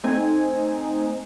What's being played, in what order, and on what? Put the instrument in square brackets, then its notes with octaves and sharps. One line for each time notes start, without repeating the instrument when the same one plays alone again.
[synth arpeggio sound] A3 C4 D#4 G#5